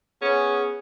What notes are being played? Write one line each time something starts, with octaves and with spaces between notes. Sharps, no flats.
B3 C#4 G#4